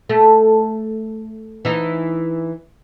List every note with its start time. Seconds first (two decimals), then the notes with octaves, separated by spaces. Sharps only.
0.09 A3
1.65 E3 D#4